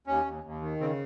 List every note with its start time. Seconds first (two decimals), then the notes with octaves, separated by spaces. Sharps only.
0.07 D#2 C#4
0.26 D#2
0.44 D#2
0.62 D#3
0.80 C#3 C4